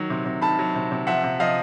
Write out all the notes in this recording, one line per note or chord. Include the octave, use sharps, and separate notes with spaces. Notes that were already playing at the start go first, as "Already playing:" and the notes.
Already playing: D#3 F#3
C3
C3
D#3 A5 B5
F#3
C3
C3
F3 E5 F#5
C3
F3 D#5 F5